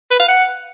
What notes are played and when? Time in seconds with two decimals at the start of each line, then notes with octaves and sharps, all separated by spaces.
0.11 B4
0.19 F5
0.28 F#5